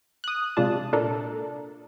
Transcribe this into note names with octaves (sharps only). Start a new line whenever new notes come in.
D#6 F#6
C3 G#3 D4 F4 A5
A#2 D4 A4 A#4